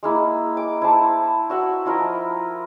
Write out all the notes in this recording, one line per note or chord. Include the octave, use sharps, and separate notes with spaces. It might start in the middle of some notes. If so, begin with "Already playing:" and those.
G#3 A#3 E4
D6
E4 C5 A5
F#4 E5 F#5
F3 E4 A#4 D#5